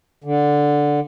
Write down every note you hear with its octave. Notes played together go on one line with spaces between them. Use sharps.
D3